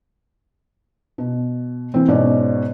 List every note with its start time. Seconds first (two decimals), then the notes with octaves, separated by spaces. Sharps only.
1.18 B2
1.94 E3 C4
2.08 G#2 B2 C#4 D5